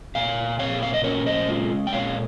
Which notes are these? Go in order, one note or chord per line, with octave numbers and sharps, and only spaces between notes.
A#2 F5 G#5
A#2 C#5 F5
F5
D#5
C#4 A#4 C#5
C5 D#5
G#3 F4
G5
A#2 C#5 F5